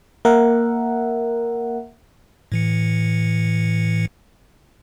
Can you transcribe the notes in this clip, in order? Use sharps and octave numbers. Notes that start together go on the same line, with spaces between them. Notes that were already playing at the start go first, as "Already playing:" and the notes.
A#3 A#4 E5 F#5
A2 E3 C#7